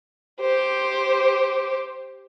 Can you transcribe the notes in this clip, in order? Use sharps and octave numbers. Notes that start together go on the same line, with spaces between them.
G4 C5